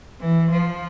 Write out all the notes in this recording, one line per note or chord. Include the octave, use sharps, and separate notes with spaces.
E3
F3